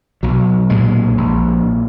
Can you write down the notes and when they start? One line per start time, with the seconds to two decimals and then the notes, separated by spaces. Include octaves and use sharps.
0.23 B1 F#3
0.70 A#2 G#3
1.18 A#1